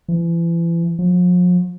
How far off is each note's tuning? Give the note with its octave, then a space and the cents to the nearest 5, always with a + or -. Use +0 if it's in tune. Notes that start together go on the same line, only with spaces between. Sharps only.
E3 +35
F3 +40